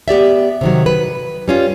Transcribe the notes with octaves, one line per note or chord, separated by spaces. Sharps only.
B3 G4 D5 E5
C3 D#3 F#3
B4
G3 C#4 F4